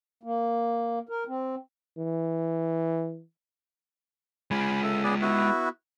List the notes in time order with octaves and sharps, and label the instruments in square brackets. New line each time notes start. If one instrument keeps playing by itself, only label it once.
[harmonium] A#3
A#4
C4
[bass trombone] E3
[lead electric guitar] G#3 F4 [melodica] G#5 B5
[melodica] A4 E5
B3 G#4 D5
B3 E4 F#4